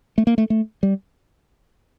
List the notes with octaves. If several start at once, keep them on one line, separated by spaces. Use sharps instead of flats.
A3
A#3
A3
A3
G3